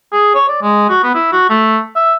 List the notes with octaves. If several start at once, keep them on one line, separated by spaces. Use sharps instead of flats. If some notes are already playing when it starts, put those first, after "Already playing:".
G#4
C#5
D5
G#3
F#4
B3
E4
F#4
A3
E5